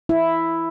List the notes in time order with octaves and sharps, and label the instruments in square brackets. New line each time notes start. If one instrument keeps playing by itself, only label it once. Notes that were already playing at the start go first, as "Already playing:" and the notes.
[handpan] E4